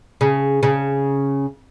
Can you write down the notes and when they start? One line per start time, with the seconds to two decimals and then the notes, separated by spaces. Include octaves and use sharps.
0.21 C#3
0.63 C#3